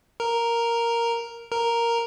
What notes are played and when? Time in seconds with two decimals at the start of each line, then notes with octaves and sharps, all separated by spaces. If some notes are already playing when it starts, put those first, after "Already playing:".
0.20 A#4
1.52 A#4